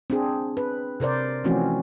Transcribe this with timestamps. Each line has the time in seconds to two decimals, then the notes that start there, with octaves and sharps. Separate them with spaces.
0.10 C4 D4 G#4
0.57 B4
1.00 C3 A#4 C5 D5
1.44 E3 F3 A3 C4 C#4 F#4